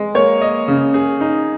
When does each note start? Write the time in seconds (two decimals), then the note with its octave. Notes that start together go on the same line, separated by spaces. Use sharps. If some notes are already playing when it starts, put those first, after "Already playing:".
Already playing: G#3
0.15 A#3 C#5
0.41 D#5
0.68 C#3
0.94 G#4
1.21 D#4